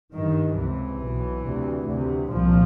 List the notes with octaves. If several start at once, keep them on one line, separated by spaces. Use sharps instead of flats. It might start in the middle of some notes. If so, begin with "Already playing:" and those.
G1 G2 D#3
C#2 C3 E3
B1 B2
D2 C3
D2 C3
C2 A#2 F3